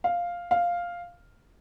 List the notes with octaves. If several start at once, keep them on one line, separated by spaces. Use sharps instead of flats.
F5
F5